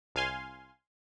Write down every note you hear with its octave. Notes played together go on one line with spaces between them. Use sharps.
C2 F5 G#5 C6